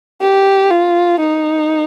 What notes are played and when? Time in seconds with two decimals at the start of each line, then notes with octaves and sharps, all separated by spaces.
0.21 G4
0.71 F4
1.20 D#4